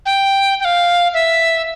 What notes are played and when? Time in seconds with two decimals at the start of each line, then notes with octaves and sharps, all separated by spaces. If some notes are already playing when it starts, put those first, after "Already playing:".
0.06 G5
0.60 G5
0.65 F5
1.14 E5